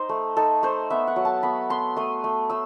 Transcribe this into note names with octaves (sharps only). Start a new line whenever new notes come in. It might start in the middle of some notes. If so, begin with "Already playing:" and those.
Already playing: D#4 C5
A3
D#4 A4
A3 C5
B3 E5
F#5
F#3
A5
B3 B5
B3 C6
A3 D#6
A3
A3 E6